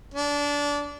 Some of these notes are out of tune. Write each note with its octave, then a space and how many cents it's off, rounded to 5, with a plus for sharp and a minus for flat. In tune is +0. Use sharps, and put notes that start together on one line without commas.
D4 -20